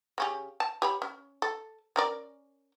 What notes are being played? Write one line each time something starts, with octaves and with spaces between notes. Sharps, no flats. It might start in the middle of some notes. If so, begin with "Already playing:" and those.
C#3 C#4 G4
A5
G4 C#5 B5
C#4
A4
C#4 A#4 D5